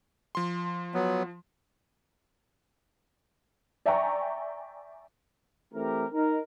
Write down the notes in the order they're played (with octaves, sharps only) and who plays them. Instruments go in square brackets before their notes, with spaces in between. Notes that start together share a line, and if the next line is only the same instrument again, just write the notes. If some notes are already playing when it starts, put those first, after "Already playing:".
[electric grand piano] F3 C6
[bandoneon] F#3 B3
[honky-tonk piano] D5 E5 G5 G#5 A#5 C#6
[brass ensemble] E3 A3 C4 G4 A#4
D#4 A#4